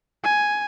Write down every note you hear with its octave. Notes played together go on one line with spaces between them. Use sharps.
G#5